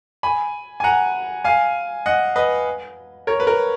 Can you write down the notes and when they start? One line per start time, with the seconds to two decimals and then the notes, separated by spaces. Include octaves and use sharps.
0.23 G#5 B5
0.80 G#5
0.84 F#5 A#5
1.44 F5 G#5
2.06 D#5 F#5
2.36 B4 D#5
3.27 A#4 C#5
3.40 B4
3.47 A#4